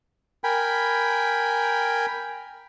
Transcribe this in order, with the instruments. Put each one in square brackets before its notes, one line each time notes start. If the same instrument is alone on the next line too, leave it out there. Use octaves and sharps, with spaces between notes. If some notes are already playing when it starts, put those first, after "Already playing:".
[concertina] A#4 G5 G#5 B5